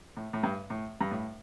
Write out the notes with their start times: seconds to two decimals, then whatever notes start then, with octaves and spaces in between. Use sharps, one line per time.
0.17 A2
0.33 A2
0.43 G2
0.70 A2
1.01 G2
1.11 A2